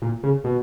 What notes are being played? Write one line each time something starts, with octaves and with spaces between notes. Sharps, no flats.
A#2
C#3
B2